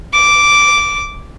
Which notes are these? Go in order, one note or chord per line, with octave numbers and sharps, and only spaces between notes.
D6